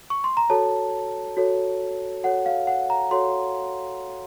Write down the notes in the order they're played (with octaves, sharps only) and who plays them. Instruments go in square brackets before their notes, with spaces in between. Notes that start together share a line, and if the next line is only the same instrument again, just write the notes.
[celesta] C#6
C6
A#5
F#4 A4 C#5 A5
F#4 A4 C#5
F#4 A4 C#5 F#5
F5
F#5
A#5
F#4 A4 C#5 C6